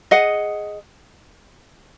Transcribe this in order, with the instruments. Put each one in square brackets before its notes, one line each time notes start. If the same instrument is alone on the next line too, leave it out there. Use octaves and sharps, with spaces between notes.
[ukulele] G#4 D#5 F#5